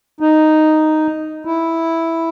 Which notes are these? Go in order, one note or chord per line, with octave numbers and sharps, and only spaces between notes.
D#4
E4